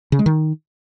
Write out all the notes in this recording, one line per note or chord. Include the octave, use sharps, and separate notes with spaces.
C#3
G#3
D#3